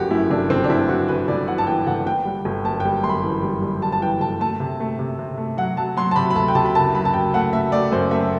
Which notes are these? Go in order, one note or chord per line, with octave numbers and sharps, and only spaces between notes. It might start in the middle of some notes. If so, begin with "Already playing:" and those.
Already playing: G1 F#2 F#4 G4
F#2 E4
G1 D4
G1 C4
D4
G1 E4
G1 F#4
G1 B4
G1 D5
E3 F#5
A5
E3 G5
G1 F#5
G1 G5
G3
G1
F#2 A5
G3 G5
F#2 C6
B5
E3
G3
G3
G3 A5
A5
E3 G5
G1 A5
A3 A5
C3
A3
C3
C3
A3
F#3 F#5
F#3 A5
F#3 C6
A5
C3 B5
B5
D2 A5
G5
C3 A5
B5
F#1 A5
F#3 B5
A5
F#1 G5
A3 F#5
A3 E5
A3 D5
F#2 C5
A3 E5